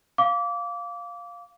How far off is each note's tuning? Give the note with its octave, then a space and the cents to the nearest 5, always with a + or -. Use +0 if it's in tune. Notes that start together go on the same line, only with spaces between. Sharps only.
F5 +0 D6 -25